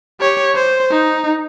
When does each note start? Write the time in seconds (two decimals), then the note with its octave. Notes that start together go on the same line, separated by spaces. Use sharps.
0.20 G4 C#5
0.55 C5
0.91 D#4